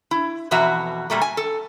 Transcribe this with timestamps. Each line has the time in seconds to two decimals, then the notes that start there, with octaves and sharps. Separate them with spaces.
0.11 E4
0.51 F2 B2 E3 F#4 E5 A#5
1.10 A#2 G3 A3 A#3
1.22 G#5
1.37 A4